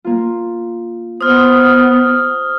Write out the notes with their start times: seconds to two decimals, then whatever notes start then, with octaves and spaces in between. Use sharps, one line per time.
0.04 A#3 F4
1.21 B3 C5 D#6 F6